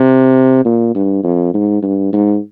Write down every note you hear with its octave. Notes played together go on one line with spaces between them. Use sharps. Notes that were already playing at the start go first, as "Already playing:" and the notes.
Already playing: C3
A#2
G2
F2
G#2
G2
G#2